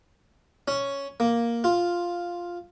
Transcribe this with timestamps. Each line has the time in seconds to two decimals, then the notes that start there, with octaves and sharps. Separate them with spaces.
0.68 C#4
1.20 A#3
1.64 F4